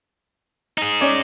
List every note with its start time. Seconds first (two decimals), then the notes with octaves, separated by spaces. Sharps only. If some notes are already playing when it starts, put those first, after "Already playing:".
0.78 D#4 G#4
1.01 C#4 C#5 D5